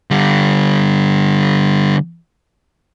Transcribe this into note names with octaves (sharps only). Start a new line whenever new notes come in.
D3 G3